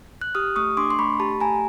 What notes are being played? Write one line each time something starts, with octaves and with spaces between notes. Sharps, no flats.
F#6
G4 D#6 F6
A3 C#6 D#6
D4 C6 D6
C6
A3 B5 C#6
G4 A5 B5
A3 G#5 A#5